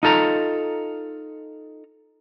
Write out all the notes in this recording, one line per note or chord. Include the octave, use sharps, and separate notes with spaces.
D#4 F4 A4 A#5